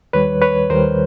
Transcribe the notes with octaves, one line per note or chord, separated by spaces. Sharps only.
D#2 D#3 G3 B4 C#5
B4 C#5
D#2 D#3 G3 A#4 C5